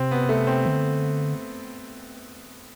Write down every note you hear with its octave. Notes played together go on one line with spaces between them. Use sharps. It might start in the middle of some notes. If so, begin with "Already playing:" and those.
Already playing: C3 C4
B3
A3
C4
D3